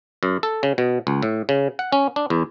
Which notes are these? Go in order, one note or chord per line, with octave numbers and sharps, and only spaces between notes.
F#2
A4
C#3
B2
C#2
A2
C#3
F#5
C#4
D4
E2